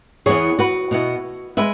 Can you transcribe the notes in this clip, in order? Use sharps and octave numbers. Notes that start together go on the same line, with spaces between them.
E2 E3 B3 E4 G#4 C#5
F#4 B4
B2 B3 E4
G#3 B4 E5